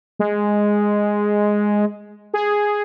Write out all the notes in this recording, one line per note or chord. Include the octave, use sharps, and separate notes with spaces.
G#3
G#4